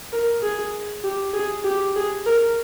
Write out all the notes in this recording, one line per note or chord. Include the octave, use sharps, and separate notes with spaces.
A#4
G#4
G4
G#4
G4
G#4
A#4